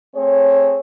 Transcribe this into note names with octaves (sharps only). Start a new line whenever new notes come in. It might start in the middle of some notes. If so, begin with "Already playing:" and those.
A3 C4 G#4 C#5